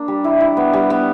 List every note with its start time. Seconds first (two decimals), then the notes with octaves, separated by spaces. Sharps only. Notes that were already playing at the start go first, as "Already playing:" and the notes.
Already playing: A#3 D4
0.08 G3
0.24 E4
0.41 E4
0.57 B3
0.73 G3
0.90 B3